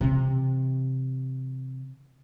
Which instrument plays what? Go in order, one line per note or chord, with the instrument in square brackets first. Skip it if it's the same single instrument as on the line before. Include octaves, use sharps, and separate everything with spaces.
[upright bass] C3 E3